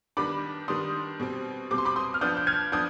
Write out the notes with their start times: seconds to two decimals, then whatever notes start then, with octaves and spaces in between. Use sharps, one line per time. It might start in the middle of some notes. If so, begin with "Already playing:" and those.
0.17 D#3 G3 B3 D4 B5 D6
0.68 D#3 G3 B3 D4 C6 D#6
1.20 B2 G3 C4
1.71 B2 G3 C4 D6
1.78 C6
1.85 B5 D6
1.96 C6 D#6
2.14 F6
2.21 F3 B3 D4 D#6 G6
2.37 G6
2.47 F6 G#6
2.72 F3 B3 D4 D#6 G6